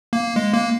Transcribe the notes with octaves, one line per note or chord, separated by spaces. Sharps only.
A#3
G#3
A#3